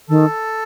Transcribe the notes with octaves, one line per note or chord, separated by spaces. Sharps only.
D#3 A4